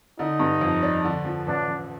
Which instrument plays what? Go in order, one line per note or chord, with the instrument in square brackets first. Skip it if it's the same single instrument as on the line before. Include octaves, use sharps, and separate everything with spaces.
[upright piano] D3 [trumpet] D#4
[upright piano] G2
F2
D4
D3
F3
[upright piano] A1 [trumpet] D4
[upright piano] A1